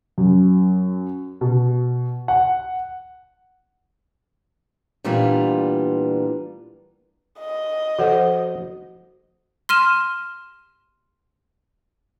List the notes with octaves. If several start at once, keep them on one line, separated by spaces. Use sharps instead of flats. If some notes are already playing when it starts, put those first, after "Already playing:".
F#2
B2
F#5
A#2 E3 G3 B3 D4 F4
D#5
F3 F#4 A4 C5 F#5
C6 F6 D#7 E7